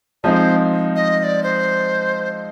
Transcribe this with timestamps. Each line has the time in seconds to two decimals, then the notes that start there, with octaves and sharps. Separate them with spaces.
0.24 F3 G#3 C4 D#4 C5 D5
0.96 D#5
1.19 D#5
1.24 D5
1.43 C5